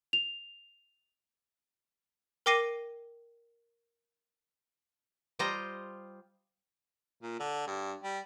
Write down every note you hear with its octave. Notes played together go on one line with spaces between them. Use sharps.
F7
A#4 G5 D6 A#6 C7 D#7
G3 F4 C5 D#5 A#5
A#2
D3
G2
G3